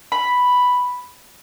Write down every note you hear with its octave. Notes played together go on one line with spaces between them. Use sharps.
B5